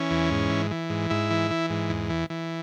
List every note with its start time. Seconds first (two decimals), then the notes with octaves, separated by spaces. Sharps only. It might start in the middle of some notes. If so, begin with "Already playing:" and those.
Already playing: E3 C#4
0.11 E2
0.31 G#2
0.50 E3
0.71 E3
0.90 G#2
1.10 G#2 E4
1.31 E3
1.51 E3
1.70 G#2
1.90 E2
2.10 E3
2.30 E3